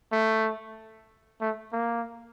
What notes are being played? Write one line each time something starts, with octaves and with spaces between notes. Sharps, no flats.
A3
A3
A#3